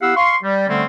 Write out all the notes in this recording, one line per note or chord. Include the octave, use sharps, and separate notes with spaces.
B3 E4 G4 F5 F#5 E6
F5 C6 C#6
G3
D3 G3 A3 C4 C#4